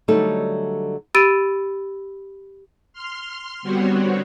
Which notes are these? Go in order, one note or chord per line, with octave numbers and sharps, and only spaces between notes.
D3 F#3 G3 A3 D#4 A4
G4 B5 E6 A6 D7 D#7
C6 F6
D3 G3 B3 C4 F#4 C#5